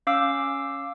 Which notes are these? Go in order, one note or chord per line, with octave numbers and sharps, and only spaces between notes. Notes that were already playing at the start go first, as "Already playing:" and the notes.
C#4 F5 D6 E6